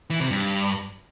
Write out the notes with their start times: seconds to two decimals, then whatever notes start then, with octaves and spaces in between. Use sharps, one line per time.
0.10 E3
0.20 C3
0.31 G2